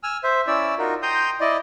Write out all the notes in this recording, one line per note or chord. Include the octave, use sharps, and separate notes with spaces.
G#5 E6 F6
C5 E5
C#4 E4 D5 E6
D#4 F4 F#4 A#4
G5 A#5 C6 D#6 G6
E4 D5 D#5